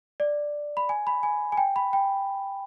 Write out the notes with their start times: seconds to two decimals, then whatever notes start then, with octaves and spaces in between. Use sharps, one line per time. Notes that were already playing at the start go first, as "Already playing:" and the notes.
0.20 D5
0.77 B5
0.89 G#5
1.07 B5
1.23 G#5
1.52 G#5
1.57 G5
1.76 B5
1.93 G5